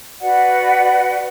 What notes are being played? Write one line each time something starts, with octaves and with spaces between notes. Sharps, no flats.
F#4 B4 D5 F#5